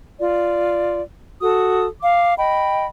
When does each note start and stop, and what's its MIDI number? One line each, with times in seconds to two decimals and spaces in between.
0.19 1.01 65
0.19 1.01 74
1.41 1.87 66
1.41 1.87 69
1.41 1.87 87
2.01 2.33 77
2.01 2.33 86
2.38 2.85 75
2.38 2.85 79
2.38 2.85 83